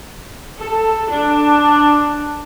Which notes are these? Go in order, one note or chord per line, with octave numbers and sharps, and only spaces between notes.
A4
D4